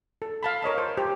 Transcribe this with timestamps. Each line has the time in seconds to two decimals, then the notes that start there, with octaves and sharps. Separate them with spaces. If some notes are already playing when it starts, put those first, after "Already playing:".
0.22 A4
0.43 F5 A5 B5
0.62 A#4 C#5 D#5 A5
0.78 C5
0.97 G4 C5